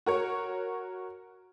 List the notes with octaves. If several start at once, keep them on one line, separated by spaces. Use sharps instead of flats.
F#4 A#4 C#5